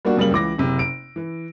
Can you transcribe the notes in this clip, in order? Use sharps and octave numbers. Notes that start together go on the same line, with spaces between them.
G3 A#3 D4 F#4
F#2 C#3 G3 A#3 F#7
C#2 E3 D6 A#6
F#1 C3
D7
E3